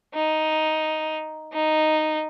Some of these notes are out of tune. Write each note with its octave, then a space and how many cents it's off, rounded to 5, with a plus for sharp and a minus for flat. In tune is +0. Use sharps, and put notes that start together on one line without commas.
D#4 +5
D#4 -5